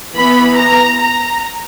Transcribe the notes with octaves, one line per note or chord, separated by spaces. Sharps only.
E3 B3 B5
A#5
A#5